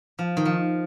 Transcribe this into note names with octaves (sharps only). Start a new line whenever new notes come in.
F3
D#3
F3